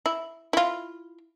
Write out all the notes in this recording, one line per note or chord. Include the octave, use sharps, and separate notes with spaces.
E4
E4 F4